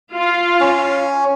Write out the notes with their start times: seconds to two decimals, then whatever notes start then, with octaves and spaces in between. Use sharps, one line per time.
0.13 F4 F5
0.60 C#4